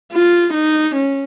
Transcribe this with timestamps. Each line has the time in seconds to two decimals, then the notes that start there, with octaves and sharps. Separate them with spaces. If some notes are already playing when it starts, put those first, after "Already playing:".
0.13 F4
0.54 D#4
0.96 C#4